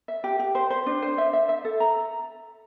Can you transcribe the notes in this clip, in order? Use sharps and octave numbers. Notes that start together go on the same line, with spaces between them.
E5
G4
G4
C5
C5
D4
C5
E5
E5
E5
A4
A#5